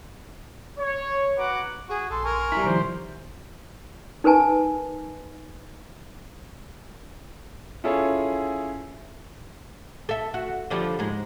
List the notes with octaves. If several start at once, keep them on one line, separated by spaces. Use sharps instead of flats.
C#5
F#4 B4 F#5 A#5 D6
F#4 G#4
A#1 A4 C6
A#4 G#5 C#6
G3 E4 A#5 B6
B2 D#3 F3 C5
D#4 A#4 B4 G#5 A5
C#4 E4 F4 G#4 A4 C#5
A4 E5
F#4
D3 F3 G3
G#2 G#3